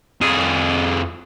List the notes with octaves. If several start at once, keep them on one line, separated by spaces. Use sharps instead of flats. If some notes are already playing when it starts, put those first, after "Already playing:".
F2 G#4